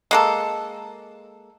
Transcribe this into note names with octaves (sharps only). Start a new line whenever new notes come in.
G#3 A#3 A4